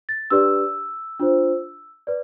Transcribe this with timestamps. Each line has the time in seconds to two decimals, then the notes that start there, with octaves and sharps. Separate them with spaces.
0.09 A6
0.30 D4 G4 B4 D5 E6
1.20 D4 F4 C5
2.07 B4 D5